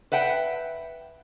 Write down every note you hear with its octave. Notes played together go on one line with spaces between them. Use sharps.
B4 E5 F#5 G5